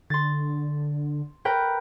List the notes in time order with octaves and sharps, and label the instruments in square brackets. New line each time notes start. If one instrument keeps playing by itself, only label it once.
[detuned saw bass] D3 [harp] C6 A6
[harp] A#4 B4 G5